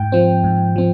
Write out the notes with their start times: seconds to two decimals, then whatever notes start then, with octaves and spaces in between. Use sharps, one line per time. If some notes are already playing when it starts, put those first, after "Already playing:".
Already playing: G#2 G5
0.12 F3 C4
0.44 G#2
0.76 F3 C4